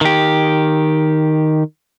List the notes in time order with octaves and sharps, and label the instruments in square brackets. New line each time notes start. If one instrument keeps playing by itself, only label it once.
[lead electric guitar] D#3 G4